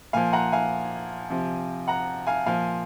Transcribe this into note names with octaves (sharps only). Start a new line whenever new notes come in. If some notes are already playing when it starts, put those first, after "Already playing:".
A#2 F3 F5 G#5
F#5 A#5
F5 G#5
C3 F3
F#5 A#5
F5 G#5
A#2 F3 F5 G#5